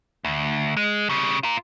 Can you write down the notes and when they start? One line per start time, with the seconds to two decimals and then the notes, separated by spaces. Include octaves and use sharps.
0.25 D2
0.77 G#3
1.09 C#3 G3
1.43 F4 A#4